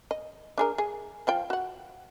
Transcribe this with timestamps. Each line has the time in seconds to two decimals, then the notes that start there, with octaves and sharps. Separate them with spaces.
0.11 D#5
0.58 D4 G#4 A#4
0.78 G#4
1.27 F3 F4 G5
1.50 F#4 F#5